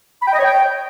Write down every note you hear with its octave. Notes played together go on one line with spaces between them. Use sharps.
B5
G5
D#5
C#5
G5